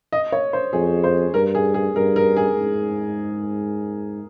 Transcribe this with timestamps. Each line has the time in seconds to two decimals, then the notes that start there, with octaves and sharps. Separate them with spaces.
0.12 D#5
0.32 C#5
0.53 C5
0.73 F2 G#4
1.04 C5
1.34 G2 A#4
1.55 G#4
1.74 G#4
1.95 G2 A#4
2.16 A#4
2.37 G#4
2.57 G#2